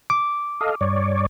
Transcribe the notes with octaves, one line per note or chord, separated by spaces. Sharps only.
D6
A4 D#5 F5
G2 C#5 D5